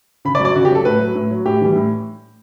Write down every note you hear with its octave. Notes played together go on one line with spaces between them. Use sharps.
C#3 B5
D5
F#3
D5
C#3 F#4
G4
F#3 A4
A2 B4
F#3
A2
F#3
A2 G4
E3 G3
A2